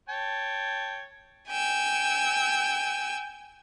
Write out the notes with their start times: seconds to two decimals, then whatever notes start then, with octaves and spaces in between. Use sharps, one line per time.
0.09 C#5 G5 A5
1.49 G5 G#5 E6